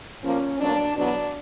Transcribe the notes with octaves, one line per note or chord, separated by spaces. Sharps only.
A#2 F3 A#3 C#4
B2 F#3 A#3 D4
E2 B2 F#3 B3 D4